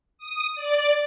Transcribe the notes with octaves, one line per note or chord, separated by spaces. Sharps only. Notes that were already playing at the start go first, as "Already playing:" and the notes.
D#6
D5